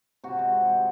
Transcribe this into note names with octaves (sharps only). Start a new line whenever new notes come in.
C3 F#4
G#3
C3
G#3